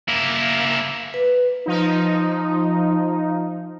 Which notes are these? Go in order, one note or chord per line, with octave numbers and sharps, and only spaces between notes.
A#3 E4
B4
F3 D#4